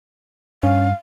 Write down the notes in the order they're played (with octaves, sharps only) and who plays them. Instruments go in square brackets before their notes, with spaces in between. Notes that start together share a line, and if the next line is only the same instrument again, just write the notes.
[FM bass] G2 [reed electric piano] C#4 [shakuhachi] F5